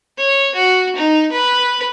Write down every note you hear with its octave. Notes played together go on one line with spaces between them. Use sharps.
C#5
F#4
D#4
B4